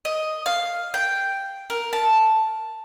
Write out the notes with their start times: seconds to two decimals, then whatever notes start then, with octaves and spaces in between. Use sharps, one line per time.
0.05 D#5
0.46 F5
0.94 G5
1.70 A#4
1.93 A5